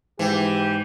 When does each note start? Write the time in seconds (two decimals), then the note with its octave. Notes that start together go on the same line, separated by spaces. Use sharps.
0.19 G#2 E3 G4